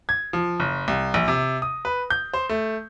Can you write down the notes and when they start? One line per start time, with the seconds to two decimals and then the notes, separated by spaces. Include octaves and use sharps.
0.09 G#6
0.33 F3
0.60 F#1
0.88 C2
1.14 A#1
1.28 C3
1.62 D#6
1.85 B4
2.10 G6
2.34 C5
2.49 A3